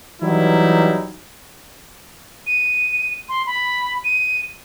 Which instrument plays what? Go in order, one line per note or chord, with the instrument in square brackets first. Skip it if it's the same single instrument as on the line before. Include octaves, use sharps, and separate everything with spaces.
[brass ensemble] E3 F#3 G3 D#4 E4
[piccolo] D#7
C6
B5
D#7